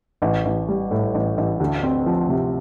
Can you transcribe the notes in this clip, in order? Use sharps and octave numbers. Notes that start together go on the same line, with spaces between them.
A1
A1
G3
A2
A1
A1
D2
C4
F3
C3